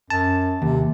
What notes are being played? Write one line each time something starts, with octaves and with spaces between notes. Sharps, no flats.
F#2 A5
D#2 C3